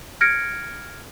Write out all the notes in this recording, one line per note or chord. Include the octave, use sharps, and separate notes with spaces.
F6 G#6 A#6 C#7 D7